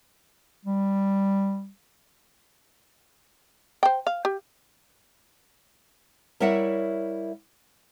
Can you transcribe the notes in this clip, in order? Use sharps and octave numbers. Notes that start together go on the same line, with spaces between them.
G3
C5 G5
F5
G4
G3 E4 A#4 C#5 E5 F#5